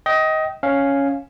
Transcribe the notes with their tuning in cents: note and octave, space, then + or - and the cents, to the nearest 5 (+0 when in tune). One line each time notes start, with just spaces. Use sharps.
D#5 +20 G5 -25
C#4 +0 F5 +0